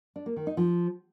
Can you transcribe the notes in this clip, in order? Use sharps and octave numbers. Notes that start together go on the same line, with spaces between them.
D4
A#3
D#3
D#4
F3